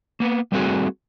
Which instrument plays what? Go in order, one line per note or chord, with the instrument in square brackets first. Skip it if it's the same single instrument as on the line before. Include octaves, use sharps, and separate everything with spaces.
[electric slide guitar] A#3 B3
G3 A3 A#3 C4 F#4 G#4